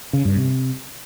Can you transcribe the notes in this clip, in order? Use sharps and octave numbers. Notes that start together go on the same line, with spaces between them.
C#3
G2
C3